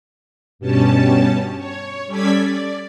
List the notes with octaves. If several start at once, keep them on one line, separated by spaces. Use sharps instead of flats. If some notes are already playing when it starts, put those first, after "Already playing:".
G2 B2 G3 C#4 A5
C#5
G3 C#4 A4 D5 G#6 B6
D5